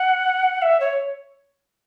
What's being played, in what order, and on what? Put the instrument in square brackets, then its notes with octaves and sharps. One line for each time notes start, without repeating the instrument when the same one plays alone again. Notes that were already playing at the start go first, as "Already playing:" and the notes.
Already playing: [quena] F#5
E5
C#5